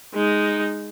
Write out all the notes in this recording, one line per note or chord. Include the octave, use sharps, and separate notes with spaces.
G#3 D#4